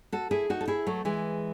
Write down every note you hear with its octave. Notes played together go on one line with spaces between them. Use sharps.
F#4 A4
E4 G#4
D#4 F#4
A4
E4 G#4
F#3 A3
E3 G#3